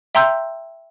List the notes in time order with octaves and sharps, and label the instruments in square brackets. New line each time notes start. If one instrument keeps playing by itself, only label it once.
[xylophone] E5 G5 A#5 C6 E6 G6